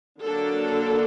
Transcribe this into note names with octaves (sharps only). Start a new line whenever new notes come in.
D3 F#3 A#3 D4 A4